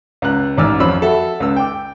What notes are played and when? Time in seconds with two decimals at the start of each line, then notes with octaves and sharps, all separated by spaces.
0.22 C#2 A#5 F#6
0.58 A1 G#2 D5 G#5 E6 F6
0.80 F2 C4 F4 C#5 B5 E6
1.02 F#4 A4 E5
1.40 C#2 E6
1.56 G5 D6